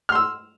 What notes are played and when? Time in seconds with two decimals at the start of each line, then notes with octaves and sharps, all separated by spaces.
0.09 F6
0.12 C6
0.15 E6